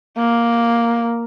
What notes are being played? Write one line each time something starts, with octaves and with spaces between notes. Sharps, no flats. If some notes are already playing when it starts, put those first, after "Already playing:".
A#3